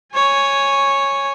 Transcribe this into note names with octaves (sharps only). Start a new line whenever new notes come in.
C#5 G#5